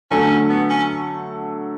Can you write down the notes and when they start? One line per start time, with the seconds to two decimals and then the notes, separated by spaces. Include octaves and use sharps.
0.11 D3 F#3 A3 C#4
0.49 B3
0.70 C#4